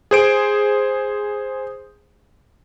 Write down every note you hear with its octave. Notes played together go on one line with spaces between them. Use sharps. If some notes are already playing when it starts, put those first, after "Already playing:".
G#4 C5 D7